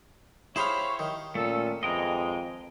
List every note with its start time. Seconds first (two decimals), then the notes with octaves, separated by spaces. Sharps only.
0.56 E4 G4 G#4 C5 C#5 F5 B5
0.99 D#3
1.35 A#2 A3 C#4 A4
1.83 F2 E3 G#3 D#5 G5 A#5